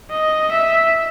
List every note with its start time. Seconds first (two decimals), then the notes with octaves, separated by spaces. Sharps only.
0.10 D#5
0.51 E5